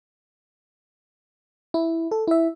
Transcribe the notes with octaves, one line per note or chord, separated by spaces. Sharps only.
E4
A4
E4 E5